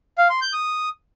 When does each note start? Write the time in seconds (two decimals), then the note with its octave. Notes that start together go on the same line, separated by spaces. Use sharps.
0.18 F5
0.30 C6
0.41 G6
0.53 D#6